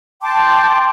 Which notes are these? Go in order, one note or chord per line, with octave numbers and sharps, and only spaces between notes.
G5 A5 C6 D6